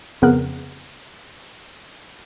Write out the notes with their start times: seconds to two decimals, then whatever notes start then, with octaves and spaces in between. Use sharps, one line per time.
0.22 F2 C#3 B3 A#4 F#6